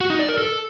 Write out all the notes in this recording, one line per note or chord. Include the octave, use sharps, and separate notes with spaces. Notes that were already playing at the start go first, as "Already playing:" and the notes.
F#4
D#4
D5
A#4
A4